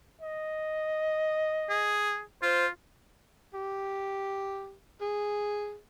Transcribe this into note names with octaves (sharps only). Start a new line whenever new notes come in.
D#5
G#4
F4 C5
G4
G#4